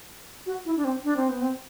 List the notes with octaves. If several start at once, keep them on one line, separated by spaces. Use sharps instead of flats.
F#4
E4
D4
C4
D4
C4
B3
C4